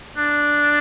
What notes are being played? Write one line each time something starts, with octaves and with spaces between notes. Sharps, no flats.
D4